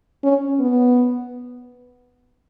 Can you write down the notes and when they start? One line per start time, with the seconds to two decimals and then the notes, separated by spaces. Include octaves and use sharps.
0.24 C#4
0.60 B3